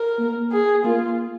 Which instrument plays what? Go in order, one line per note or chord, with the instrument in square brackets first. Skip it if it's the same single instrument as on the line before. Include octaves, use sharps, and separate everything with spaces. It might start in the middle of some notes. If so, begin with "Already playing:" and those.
Already playing: [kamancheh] A#4
[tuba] A#3
[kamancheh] G#4
[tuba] A#3 [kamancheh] F4